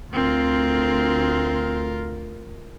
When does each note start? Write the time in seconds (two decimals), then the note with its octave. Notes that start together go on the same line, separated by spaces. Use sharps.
0.13 D2 C4 F4 A#4